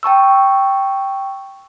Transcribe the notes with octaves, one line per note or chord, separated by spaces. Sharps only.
G5 A5 C#6 E6